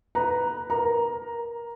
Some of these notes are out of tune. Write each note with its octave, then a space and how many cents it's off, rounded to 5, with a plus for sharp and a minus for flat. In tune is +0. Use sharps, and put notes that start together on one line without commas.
B4 +0 A#5 +0
A#4 +15 A#5 +0